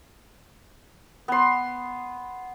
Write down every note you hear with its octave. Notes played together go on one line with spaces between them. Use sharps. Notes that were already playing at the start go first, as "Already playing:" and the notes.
B3 C6